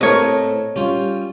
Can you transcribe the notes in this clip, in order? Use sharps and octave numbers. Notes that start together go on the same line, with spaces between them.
A2 A3 C4 A4 A#4 C#5 D#5
G3 C#4 F4